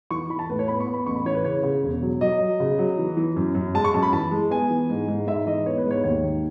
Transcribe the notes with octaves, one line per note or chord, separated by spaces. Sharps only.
E3 C#6
E3 B5
A5
A2 B4
C#5
B3 B5
C#6
B3
B5
A1 C#6
B5
E3 C#5
B4
C#3 C#5
C#3
E1
F#3
F#3 D#5
F#3
C#3
F#3
E3
E3
F#2
F#2
G#3 A5
C#6
F#2 A5
B5
E3 A5
G#3
B3 G#5
E3
G#2
G#2
G#2 E5
E3 D#5
B3 C#5
B4
G#2
C#5
D#2 C#5
D#3